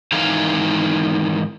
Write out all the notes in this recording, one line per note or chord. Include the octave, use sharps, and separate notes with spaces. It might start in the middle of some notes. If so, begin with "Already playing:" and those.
G#2 D#3 E3 G#4 F5 A#5